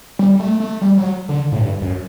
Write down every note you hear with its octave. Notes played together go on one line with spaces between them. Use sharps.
G3
A3
A3
G3
F#3
D3
A2
G2
F#2